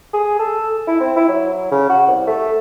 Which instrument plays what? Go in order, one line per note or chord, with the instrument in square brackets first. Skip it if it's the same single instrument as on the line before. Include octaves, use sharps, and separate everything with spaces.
[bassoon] G#4
A4
E4
C4
E4
F#3
C#3
F#4
C2
A3